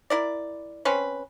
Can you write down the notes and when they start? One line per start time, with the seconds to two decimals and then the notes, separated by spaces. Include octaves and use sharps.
0.10 E4 A#4 D5
0.85 C4 C#4 B4